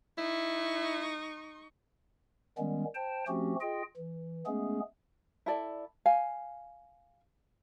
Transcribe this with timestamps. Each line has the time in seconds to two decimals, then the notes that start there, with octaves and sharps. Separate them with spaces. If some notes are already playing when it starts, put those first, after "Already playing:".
0.18 D#4 E4 C#6
2.58 D#3 G3 G#3 B3 C#4
2.95 C5 G5 A5
3.28 F3 A3 C4 C#4 F#4 G4
3.61 F4 G#4 D#5 G5
3.96 E3
4.46 G#3 A3 B3 C#4 G#4
5.46 E4 A4 D5
6.06 F5 G#5